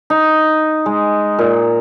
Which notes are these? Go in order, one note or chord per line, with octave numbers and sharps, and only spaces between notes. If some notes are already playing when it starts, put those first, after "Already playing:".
D#4
G#3
A#2